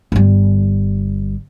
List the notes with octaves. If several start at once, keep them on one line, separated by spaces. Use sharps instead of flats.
G1 G3